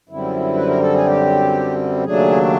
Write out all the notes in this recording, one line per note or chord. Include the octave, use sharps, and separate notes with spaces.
F#2 D3 G3 C4 E4
B4
A#4
A4
G#4
G4
D#2 C#3 F#3 A3 D4 G#4